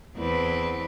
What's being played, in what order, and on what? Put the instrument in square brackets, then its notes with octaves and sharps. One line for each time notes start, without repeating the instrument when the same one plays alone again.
[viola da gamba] E2 C4 B4